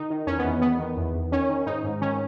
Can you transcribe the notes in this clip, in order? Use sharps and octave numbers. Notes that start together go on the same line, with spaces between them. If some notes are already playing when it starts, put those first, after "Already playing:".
Already playing: D#3 D#4
D#3
E2 C#4
B3
E2
D#3 B3
D#3
E2
E2
D#3 C#4
D#3
G#2 D#4
G#2
D#3 C#4